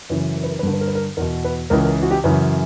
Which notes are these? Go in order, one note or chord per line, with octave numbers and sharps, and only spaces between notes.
F#2 C#3 E3 B4
A#4
B4
A#4
B4
G2 D3 A#4
B4
A#4
B4
A#4
E2 B2 A#4
B4
C#2 C#3 E3 A#4
A#4
F#4
G4
F#2 C#3 E3 B4